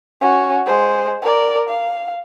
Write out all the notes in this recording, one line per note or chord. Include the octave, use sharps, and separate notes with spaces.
C#4 F#4
G#3 C5
A#4 D5
F5